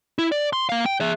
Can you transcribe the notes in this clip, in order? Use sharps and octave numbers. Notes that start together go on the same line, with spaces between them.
E4
D5
C6
A#3 F5
G5
G#4 E5